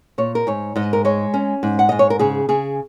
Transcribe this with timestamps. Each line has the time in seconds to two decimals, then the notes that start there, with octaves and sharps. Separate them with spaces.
0.18 A#2 C#5
0.35 A#4
0.47 G#2 C#5
0.76 G#2 D#5
0.93 A#4
1.05 G#3 C#5
1.34 C#4
1.63 G#2
1.79 F#5
1.89 G#2 D#5
1.99 C#5
2.10 A#4
2.19 C#3 G#4
2.49 C#3 G#4